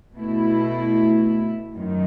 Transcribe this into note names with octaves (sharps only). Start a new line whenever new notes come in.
B2 A3 E4
F#2 D#3